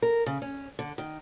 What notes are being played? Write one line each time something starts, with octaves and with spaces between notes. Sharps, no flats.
A#4
C#3
C#4
D3
D#3